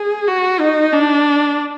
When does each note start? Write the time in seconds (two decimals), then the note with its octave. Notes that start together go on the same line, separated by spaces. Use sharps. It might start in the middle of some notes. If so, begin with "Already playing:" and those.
Already playing: G#4
0.27 F#4
0.60 D#4
0.93 D4